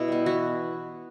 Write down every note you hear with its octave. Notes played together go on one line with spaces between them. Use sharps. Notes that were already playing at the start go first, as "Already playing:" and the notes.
Already playing: B2 E4
G3 B3
E3 F#4